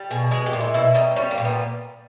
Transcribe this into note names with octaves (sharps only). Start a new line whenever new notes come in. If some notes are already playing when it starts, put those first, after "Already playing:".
Already playing: G3
B2 G#4
G#3 G#4
G4
A#2
E4
B2 E4
G3 D#4
G3 C#4
A#3
A#2
B3